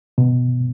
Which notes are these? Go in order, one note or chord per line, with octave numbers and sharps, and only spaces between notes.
B2